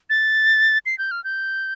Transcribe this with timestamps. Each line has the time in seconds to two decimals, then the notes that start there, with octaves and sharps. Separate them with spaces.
0.10 A6
0.86 C7
0.98 G6
1.11 F6
1.24 G6